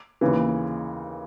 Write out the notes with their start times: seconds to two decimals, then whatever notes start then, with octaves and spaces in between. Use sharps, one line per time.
0.21 D#2 C#3 E3